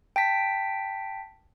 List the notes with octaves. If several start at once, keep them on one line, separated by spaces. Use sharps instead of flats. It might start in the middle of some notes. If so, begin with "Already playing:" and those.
G5 A5 B6